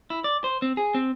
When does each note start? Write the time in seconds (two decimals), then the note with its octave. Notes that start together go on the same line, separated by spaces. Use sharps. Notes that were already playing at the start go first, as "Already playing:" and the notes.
0.10 E4
0.24 D5
0.44 C5
0.62 C4
0.77 G#4
0.95 C4